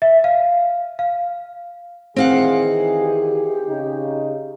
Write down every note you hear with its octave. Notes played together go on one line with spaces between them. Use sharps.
E5
F5
F5
D#3 E3 C4 G#4 F5 F#5
G4
C#3 D#4